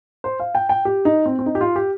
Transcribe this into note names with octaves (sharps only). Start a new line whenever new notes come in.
C5
F5
G5
G5
G4
D#4
C4
C4
D#4
G4
F4
G4